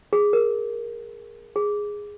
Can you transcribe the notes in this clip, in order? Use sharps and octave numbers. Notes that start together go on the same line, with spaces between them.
G#4
A#4
G#4